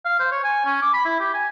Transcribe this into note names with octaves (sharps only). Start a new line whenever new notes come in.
F5
C5
C#5
G#5
C#4
D6
B5
E4
G4
G#5